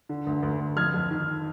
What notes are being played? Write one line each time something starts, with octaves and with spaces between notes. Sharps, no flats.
D3
D2
D2
D2
F2 F6 G#6
F2
D#3